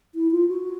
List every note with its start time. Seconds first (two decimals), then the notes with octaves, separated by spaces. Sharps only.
0.15 E4
0.31 F4
0.48 F#4